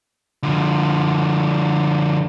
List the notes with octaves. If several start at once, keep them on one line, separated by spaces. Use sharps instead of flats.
D3 F3